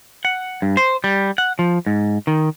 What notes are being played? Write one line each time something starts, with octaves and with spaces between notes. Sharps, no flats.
F#5
G2
C5
G3
F#5
F3
G#2
D#3